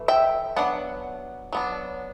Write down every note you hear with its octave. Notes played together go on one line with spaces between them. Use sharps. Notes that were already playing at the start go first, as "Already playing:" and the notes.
Already playing: E3 A3
E5 G5
F#3 B3 D4 F#5
F#3 B3 D4